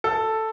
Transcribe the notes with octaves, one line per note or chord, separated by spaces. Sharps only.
A4